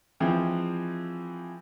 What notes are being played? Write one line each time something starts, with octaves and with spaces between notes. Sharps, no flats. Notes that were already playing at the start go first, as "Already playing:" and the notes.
E3 F3 G#3 C4